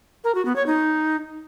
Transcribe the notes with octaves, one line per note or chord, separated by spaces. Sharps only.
A#4
F#4
B3
C#5
D#4